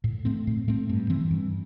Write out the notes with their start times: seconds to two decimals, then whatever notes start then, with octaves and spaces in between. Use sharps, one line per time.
0.04 A2
0.25 A3 C4
0.47 A2
0.68 A3 C4
0.89 G2
1.10 E3 C4
1.31 G2